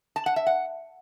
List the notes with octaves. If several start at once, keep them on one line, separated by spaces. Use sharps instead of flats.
A5
F#5
E5
F#5